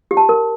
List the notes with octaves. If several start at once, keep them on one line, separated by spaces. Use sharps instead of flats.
G4
A5
A#4